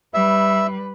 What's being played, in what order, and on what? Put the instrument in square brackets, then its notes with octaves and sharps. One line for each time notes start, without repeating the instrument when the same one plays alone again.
[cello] G3 B4 [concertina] E5